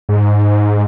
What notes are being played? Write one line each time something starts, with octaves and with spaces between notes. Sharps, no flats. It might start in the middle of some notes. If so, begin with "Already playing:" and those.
G#2